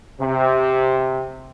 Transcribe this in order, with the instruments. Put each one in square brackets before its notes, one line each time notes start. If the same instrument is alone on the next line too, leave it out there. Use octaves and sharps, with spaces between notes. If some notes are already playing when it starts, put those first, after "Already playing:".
[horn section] C3